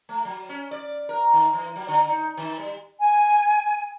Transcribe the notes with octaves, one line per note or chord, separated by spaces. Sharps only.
A3
F#3
C#4
D5
A#4
D#3
E3
F#3
D3
D#4
D#3
G3
G#5